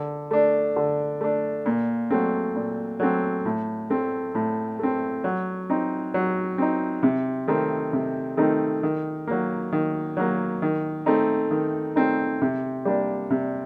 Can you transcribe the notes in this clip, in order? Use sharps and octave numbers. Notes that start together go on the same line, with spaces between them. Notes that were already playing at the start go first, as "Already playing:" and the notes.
Already playing: D3
A3 D4
D3
A3 D4
A#2
F#3 A3 C4
A#2
F#3 A3 C4
A2
A3 C4
A2
A3 C4
F#3
C4 D#4
F#3
C4 D#4
C3
D#3 A3 C4 D#4
C3
D#3 A3 C4 D#4
D#3
F#3 A#3
D#3
F#3 A#3
D#3
A3 C4 D#4
D#3
A3 C4 D#4
C3
G3 A#3 D4
C3